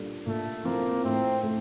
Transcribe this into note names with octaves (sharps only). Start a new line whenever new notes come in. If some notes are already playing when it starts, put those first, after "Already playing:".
Already playing: A#2 G3 D4 A4
A#2 A3
F3 A#3 C4
A2 C4
A3 C4